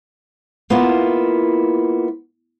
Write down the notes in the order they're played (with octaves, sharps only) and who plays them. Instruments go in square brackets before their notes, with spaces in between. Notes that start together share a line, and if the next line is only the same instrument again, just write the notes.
[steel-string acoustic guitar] A#3 B3 E4 F4